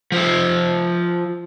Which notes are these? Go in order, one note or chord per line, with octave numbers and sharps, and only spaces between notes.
F3 E5